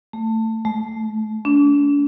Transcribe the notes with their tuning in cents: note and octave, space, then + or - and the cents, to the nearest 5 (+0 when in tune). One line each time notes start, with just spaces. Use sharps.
A3 +20
A3 -30
D4 -40